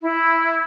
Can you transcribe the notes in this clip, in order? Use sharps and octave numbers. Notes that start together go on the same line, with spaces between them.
E4